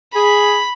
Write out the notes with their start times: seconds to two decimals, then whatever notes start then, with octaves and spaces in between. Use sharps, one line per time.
0.14 G#4 B5